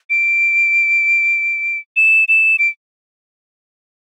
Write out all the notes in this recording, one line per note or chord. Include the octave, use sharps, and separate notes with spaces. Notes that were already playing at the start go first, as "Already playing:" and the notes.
D7
E7
E7
D7